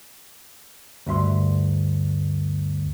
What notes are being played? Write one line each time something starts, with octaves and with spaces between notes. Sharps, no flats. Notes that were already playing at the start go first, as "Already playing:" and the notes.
D2 G2 E5 C6